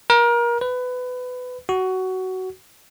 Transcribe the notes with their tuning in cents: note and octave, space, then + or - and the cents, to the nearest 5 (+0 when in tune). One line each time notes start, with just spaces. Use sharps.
A#4 +30
B4 +20
F#4 +15